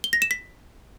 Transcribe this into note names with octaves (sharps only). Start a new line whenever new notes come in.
G7
A#6
E7
B6